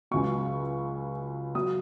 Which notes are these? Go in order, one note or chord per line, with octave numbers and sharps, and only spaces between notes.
C#2 C#3 F#3 C#6
F#3 D#6